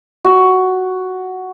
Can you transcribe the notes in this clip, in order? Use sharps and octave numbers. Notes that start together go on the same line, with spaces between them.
F#4